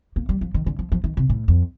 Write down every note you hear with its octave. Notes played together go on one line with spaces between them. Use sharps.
A#3
G3
F3
D#3
D3
F3
F3
D#3
C3
A2
F2